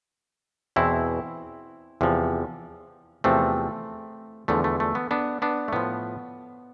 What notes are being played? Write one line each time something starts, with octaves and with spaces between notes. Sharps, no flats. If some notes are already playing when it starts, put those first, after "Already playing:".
E2 B2 C4 E4
E2 C3 F3
E2 C3 F3 A3 C4
E2 D3 F3 A3
A3
A3
B3
B3 D4
B3 D4
A3
A2 F3 B3